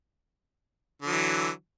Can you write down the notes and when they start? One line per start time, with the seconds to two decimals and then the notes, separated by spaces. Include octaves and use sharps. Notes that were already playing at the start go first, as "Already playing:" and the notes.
1.02 D3
1.07 F#3
1.12 E3